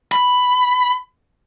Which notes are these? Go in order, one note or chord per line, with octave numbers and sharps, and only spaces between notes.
B5